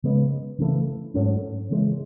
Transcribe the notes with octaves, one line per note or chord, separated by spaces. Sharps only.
C#3 G#3 B3
C#3 E3 A3
G#2 F#3 A3 C#4
C#3 E3 G#3